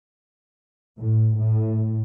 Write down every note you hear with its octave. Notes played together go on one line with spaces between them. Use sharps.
A2
A2